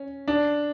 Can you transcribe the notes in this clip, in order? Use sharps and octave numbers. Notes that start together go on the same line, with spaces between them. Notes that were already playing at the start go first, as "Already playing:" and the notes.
Already playing: C#4
D4